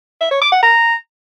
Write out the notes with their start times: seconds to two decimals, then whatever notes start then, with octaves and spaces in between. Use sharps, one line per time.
0.21 E5
0.31 C#5
0.42 D6
0.52 F#5
0.63 A#5